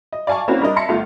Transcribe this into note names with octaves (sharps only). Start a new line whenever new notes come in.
D#5
D5 F5 G#5 A5 C#6
A#3 C4 C#4 E4 F#4
G3 D4 A#4 D#5
E5 A5 B5 C6 A#6 C#7
G1 A3 F4